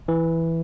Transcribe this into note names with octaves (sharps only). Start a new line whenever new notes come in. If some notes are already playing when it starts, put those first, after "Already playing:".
E3